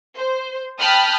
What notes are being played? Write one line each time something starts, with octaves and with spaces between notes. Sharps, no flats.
C5
G5 A5 B5 D#6 F6 F#6